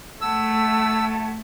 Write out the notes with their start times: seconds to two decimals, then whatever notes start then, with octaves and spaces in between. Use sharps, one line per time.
0.21 A3 F#5 A5 E6 G#6